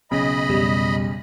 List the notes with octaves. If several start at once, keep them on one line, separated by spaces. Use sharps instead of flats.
B1 C#3 D#5 B5
F2 B2 G3